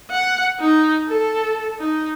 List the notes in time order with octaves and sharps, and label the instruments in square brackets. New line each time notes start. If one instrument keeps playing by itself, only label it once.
[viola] F#5
D#4
A4
D#4